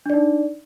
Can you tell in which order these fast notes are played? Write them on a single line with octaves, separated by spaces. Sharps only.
D4 D5 D#4